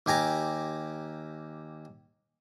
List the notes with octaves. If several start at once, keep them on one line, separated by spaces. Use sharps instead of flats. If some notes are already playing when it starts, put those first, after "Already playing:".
D#2 G4 G#5 A#5 D6